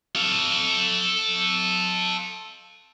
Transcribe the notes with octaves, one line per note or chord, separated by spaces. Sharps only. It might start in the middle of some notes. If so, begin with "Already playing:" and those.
A4 F5